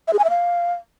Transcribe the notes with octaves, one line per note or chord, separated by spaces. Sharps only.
E5
G#4
G#5
E5
F5